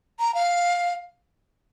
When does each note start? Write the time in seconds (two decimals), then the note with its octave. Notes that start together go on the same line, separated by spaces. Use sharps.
0.19 A#5
0.35 F5